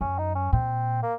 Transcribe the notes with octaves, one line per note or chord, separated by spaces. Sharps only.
F#2 C#4
D#4
C#4
A#2 C4
A#3